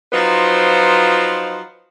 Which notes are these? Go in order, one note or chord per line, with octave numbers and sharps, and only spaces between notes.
F3 F#3 D#4 F4 B4 C5